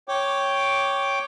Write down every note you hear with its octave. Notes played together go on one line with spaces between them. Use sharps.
C#5 G5 D6